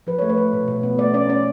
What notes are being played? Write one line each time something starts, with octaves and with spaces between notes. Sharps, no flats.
F3 B4
A3 C#5
B4
A3
B2
B2
B3
A3 D5
C#4 D5
C#4 D5